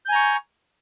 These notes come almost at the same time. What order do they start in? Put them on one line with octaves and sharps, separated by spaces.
G6 G#5 A#5 C#6